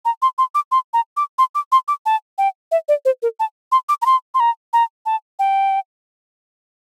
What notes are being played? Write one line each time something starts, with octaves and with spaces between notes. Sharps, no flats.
A#5
C6
C6
D6
C6
A#5
D6
C6
D6
C6
D6
A5
G5
E5
D5
C5
A#4
A5
C6
D6
A#5
C6
C6
A#5
A#5
A5
G5